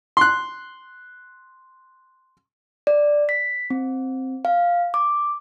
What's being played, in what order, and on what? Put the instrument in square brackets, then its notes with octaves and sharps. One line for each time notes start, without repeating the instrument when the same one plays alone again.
[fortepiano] C6 F#6
[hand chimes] D5
B6
C4
F5
D6